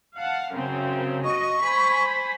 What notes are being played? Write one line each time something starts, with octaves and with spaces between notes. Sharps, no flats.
F5 F#5 A5
F#2 C#3 C4
F#4 D#5 C#6
C5 G#5 B5